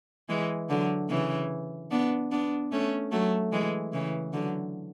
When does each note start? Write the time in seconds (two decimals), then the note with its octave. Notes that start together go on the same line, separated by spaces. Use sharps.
0.29 E3 G#3
0.70 D3 F#3
1.09 C#3 E3
1.91 B3 D4
2.31 B3 D4
2.72 A3 C#4
3.12 F#3 A3
3.52 E3 G#3
3.93 C#3 E3
4.33 D3 F#3